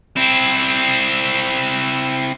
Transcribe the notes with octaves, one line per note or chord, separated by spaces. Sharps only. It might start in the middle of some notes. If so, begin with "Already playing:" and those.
C4 E4